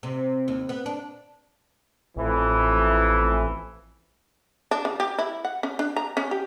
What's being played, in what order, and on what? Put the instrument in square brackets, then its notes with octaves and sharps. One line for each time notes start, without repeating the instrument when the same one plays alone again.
[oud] C3
D#2
B3
D4
[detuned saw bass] A1 [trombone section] F2 E3
[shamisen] D4
C#3
G4
E4
F#5
C#4
D4
A#5
C#4
G4